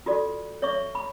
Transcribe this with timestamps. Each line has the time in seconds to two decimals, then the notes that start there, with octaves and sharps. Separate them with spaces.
0.06 F4 F#4 A4 D5
0.62 C#5 E5 C#6
0.95 B5